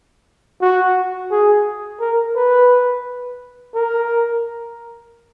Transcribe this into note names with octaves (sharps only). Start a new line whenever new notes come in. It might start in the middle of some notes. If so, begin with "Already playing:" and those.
F#4
G#4
A#4
B4
A#4